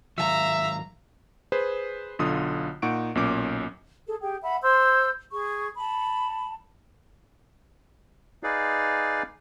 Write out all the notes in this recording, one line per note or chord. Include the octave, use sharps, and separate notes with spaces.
G#2 D#3 F#3 E5 F5 A#5
G#4 B4 C5
B1 D3 F4 D#6
A#2 D#4 F#5 C#6 D7
B1 A#2 C#4 D6
G#4 A4
G4 G#4 G5
E5 F#5 B5
C5 C6 E6 G6
G#4 C#6
A5 B5
D#4 G#4 B4 D5 F5